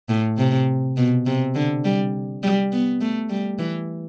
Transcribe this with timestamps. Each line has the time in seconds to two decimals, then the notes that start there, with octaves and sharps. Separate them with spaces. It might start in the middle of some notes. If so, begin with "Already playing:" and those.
0.09 A2
0.38 C3
0.97 B2
1.27 C3
1.55 D3
1.85 G3
2.43 G3
2.72 B3
3.01 A3
3.30 G3
3.59 E3